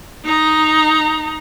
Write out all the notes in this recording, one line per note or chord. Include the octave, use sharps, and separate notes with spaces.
D#4 A#5